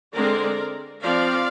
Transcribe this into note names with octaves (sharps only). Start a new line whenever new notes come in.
D3 G#3 C4 A#4 D5
F3 C4 D5 F5